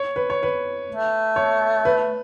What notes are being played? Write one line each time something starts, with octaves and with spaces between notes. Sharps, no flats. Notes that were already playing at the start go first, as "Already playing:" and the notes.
Already playing: C#5
B4
C#5
B4
A3
C#5
B4